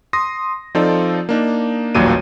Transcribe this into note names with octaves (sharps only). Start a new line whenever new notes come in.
C6 D#6 A#6
F3 C4 D#4 F4 A4 D5
A#3 D4 D#4
A1 D#2 A#2 F#3 G3 D#7